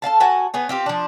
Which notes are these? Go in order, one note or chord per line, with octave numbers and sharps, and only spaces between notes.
A4 D5 F5 A5
F#4 A4 F#5 G#5
B3 G#4 C#5
C4 F4 G4
F3 D4